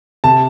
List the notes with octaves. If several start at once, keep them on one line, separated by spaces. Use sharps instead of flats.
C3 A5